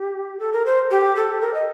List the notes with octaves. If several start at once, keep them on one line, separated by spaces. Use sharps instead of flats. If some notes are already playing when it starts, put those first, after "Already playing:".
Already playing: G4
A4
A#4
C5
G4
A4
A#4
D#5